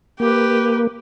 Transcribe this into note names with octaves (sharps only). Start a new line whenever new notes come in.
A#3 G4 B4